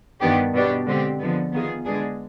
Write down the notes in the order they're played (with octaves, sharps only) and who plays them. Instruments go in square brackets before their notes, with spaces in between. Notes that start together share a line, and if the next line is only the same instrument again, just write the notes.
[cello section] G2 D#3 B3 D4 G4
B2 B3 D4 G4
D3 G#3 C4 G4
D3 F3 G#3 B3
D#3 B3 F4 G#4
D3 G#3 B3 D4 G#4